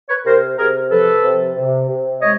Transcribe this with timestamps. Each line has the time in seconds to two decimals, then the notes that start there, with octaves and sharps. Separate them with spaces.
0.08 B4 C#5
0.25 C3 A#4 C5
0.57 C3 G#4 A#4
0.90 F3 A4 B4
1.23 C3
1.56 C3
1.89 C3
2.21 G#3 C#5 D#5